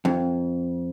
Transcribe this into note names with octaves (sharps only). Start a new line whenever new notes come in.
F2